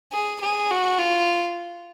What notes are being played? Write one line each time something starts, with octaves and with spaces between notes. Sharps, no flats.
G#4
G#4
F#4
F4